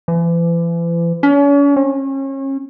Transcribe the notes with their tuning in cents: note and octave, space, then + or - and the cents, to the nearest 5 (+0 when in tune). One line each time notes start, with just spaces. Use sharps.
E3 +40
C#4 +40
C#4 -35